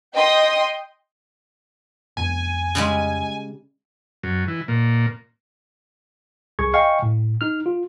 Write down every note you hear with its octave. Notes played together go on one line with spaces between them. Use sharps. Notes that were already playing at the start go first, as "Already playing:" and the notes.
D#5 G5 C6 D#6
F1 F2 B3 G#5
C#3 G3 G#3
F#2
E3
A#2
C2 G#4 C#6 G#6
D#5 F5 G5 G#5 C#6
A2
D#4 F6
F4